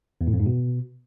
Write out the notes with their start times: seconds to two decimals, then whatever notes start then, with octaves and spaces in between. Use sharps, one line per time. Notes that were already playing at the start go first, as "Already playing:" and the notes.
0.21 E2
0.27 A2
0.33 F2
0.40 G#2
0.46 B2